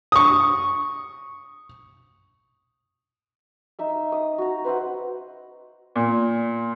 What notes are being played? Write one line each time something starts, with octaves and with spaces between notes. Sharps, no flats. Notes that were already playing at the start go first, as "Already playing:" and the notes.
C#6 D#6
D#4 E5 E6
D#6
F#4 A#5
B4 C5 E5 F#5
A#2